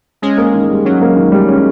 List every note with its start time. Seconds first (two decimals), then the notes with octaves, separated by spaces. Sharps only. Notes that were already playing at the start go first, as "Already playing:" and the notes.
0.22 G#3 C#4
0.38 A#3
0.54 D#3
0.69 G3
0.85 F#3 C#4
1.02 A#3
1.16 D#3
1.32 G3
1.48 C#4